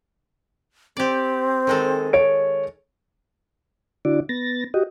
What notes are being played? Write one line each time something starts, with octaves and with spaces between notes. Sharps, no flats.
C4 G4 D5
D#3 G#3 A4
C#5 D7
D3 D4 E4 F#4 D5
B3 A6 A#6
F#4 G4 D#5